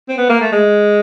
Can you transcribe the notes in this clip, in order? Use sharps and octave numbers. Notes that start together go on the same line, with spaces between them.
C4
B3
A#3
A3
G#3